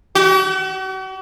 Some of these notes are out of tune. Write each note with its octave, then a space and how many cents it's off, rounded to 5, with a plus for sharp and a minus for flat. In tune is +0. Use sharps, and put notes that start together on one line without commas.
F#4 +45